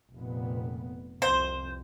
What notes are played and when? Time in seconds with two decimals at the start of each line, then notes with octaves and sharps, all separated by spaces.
0.12 F1 A#2 B3
1.22 C2 F2 C5